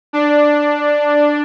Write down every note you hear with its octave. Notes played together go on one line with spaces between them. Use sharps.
D4